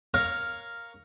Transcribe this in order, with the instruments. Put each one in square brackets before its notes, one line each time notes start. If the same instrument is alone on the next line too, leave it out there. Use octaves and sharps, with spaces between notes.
[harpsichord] A#4 C#5 F5 C#6